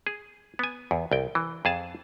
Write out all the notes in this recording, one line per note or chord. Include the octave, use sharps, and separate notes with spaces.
G#4
B3 G#5
E2
C2 G5
E3
F2 G#4 A5